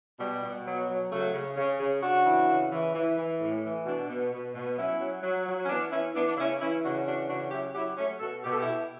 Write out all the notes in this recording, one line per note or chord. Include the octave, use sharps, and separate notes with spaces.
B2 G3
B2
F#3
F#3
C#3 F#3 A3
C#3
C#3
C#3
C#3 D4 F#4
E3
C#3
E3
E3
E3
A2
E3
B2 D4 F#4
B2
B2
B2
F#3 C#4 E4
F#3
F#3
F#3
C#4
E3 B3 D4
E3 C#4 E4
E3 B3 D4
D4
C#3 C#4 E4
E3 C#4 E4
C#3 D4 F#4
E3 D4 F#4
C#3 D4 F#4
F#3 E4 G4
F#3 E4 G4
F#3 A3 C#4
B2 F#4 A4
B2 G4
A4
E4 G4
B2